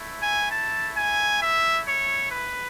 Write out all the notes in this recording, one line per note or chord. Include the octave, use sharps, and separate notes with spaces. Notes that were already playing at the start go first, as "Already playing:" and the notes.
Already playing: A3 E4
G#5
A5
G#5
E5
C#5
B4